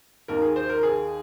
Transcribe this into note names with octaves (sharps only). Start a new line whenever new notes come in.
D#2 D#3 A#4
G#4
C5
A#4
G#4